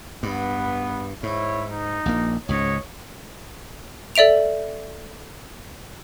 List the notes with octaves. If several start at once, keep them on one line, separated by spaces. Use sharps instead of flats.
G2 B3
G#2 E4 C#5
D#4
A#1 A#3
C#2 G#2 C#5 D#5
A4 D5 E5 D7 F7